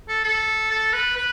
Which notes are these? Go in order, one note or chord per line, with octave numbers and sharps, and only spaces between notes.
A4
A4
A4
B4
B4